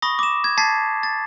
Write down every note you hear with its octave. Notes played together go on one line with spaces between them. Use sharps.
B5 C#6 D#6 A#6
D6 E7
G#6
A5 G#6 A6 B6 C7
A6